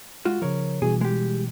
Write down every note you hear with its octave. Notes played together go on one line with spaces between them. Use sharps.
G#3 F4 F#4
C#3 F3 A#4 C#5
B2 E3 G3 G#4
G#3 G4